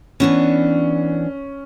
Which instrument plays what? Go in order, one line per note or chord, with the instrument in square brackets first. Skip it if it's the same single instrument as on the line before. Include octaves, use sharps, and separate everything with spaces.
[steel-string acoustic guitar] E3 B3 D4 [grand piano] C#4